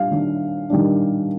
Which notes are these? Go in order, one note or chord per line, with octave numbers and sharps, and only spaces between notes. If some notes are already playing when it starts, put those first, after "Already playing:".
Already playing: G3 D4 F5
D#3 G3 D4
D#3 G3 D4